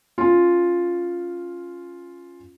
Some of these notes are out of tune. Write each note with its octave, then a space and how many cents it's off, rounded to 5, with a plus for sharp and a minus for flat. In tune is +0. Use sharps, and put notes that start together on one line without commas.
C#4 +0 F4 +0